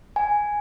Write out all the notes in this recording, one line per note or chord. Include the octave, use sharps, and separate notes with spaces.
G#5